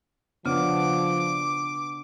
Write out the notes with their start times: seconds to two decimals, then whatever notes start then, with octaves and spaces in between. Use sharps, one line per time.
0.46 C#3 F3 B3 D4 D6